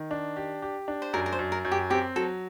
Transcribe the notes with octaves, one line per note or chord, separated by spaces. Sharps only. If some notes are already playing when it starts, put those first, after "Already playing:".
Already playing: D#3
D4
G4
G4
D4
C5
F#2 A#4
A#4
C5
F#2
A#4
F#2
G4
C4 G4
F#3 A4